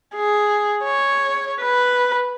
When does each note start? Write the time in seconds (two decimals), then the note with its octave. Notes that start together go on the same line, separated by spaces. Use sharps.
0.15 G#4
0.84 C#5
1.61 B4